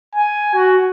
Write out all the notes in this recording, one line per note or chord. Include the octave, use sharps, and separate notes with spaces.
G#5
F#4